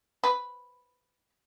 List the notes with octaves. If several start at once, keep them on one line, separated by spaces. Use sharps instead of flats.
B4